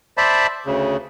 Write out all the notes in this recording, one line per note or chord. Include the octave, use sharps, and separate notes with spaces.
C5 D5 E5 A5 B5
D2 C#3